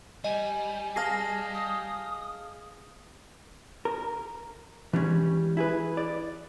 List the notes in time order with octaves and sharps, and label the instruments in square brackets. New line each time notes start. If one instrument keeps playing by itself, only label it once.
[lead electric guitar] G3 [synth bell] D#5 [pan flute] G#5
[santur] G#4 D#5 F5 [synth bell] A5 A#6 C7
[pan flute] D#6
[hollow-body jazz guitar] A#4
E3 G3 G#3 C#4
E4 G#4 B4
D5